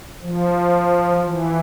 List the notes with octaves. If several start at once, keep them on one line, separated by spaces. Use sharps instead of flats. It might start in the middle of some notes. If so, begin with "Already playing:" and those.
F3
E3